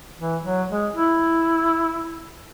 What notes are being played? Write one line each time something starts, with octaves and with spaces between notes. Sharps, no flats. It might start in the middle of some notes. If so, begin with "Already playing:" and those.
E3
F#3
G#3
E4